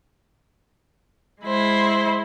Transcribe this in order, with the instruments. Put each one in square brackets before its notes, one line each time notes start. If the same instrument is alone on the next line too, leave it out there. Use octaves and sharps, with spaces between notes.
[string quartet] G#3 E4 C5